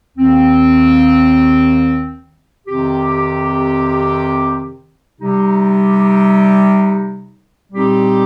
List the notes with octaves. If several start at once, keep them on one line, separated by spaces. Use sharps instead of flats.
D#2 D#3 C4
F2 C3 D#3 C4 G4
C3 G3 D#4 G4
A#2 G3 C4 D#4 G4